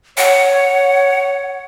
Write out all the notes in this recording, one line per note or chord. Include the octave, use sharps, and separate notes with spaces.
C#5 F#5